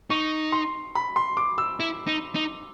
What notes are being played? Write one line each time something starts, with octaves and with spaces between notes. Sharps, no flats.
D#4 C#6
C6
B5
C6
D6
E6
E4
D#4
D#4